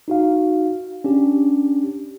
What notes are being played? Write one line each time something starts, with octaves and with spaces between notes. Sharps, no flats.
D#4 F#4 F5
C#4 D4 G4